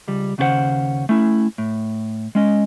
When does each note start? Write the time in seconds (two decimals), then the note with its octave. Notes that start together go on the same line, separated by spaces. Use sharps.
0.08 C#2 G3
0.38 D#2 C#3 C#4 F#4 C5 F#5
1.09 A3 C#4 E4
1.58 A2
2.35 G#3 C#4 D#5